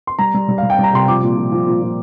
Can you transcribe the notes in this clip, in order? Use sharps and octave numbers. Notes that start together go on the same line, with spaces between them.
C6
G3 A#5
G3
G3
F5
G3
G5
G3 A#5
C3 C6
F3 D6
A#2
F3
F3
A#2
A#2